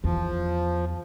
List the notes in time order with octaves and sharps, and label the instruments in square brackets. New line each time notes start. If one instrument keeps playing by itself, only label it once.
[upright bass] E2 [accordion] F3